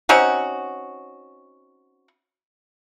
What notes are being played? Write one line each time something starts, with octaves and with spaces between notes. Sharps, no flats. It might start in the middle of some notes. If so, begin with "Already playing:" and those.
C4 C#4 D#4 F#4